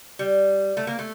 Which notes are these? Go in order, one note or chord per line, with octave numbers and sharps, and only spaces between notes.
G3
A3
A#3
A3